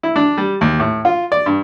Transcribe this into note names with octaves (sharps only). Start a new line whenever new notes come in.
E4
D4
G3
D#2
A2
F4
D5
G2